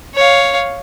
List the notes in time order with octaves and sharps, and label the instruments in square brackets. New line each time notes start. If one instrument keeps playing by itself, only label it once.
[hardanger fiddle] C#5 F5